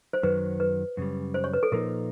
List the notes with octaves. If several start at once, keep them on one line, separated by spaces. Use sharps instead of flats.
C5
F#2 D#3 F#3 B4
B4
F#2 C#3 G3
C5
C#5
B4
A4
A#2 F3 A#3 D#4 A#4